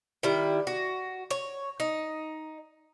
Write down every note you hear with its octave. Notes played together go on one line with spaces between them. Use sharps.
D#3 G3 E4
F#4
C#5
D#4